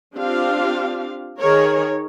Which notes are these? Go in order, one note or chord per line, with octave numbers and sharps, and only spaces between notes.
C4 D4 F4 G4 F5
D#3 G#4 A#4 C#5